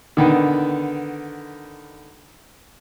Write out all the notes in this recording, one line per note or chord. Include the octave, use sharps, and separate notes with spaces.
D3 D#3 B3